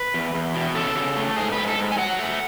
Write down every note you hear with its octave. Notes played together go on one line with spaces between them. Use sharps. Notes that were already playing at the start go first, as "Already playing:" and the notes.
Already playing: B4
E2
E2
B2
C#3 A4
C#3
A3
G#2 G#4
B4
G#2
A4
G#2
G#5
F#3 F#5
A3